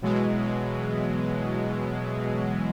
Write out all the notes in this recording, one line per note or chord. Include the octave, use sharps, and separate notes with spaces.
B2 E3 F#3 G#3